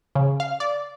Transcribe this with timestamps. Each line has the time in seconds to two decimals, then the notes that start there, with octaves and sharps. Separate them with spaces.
0.15 C#3
0.40 F5
0.60 D5